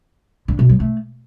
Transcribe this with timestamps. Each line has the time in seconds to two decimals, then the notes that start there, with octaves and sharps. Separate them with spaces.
0.48 D3
0.59 B2
0.69 F#3
0.80 A3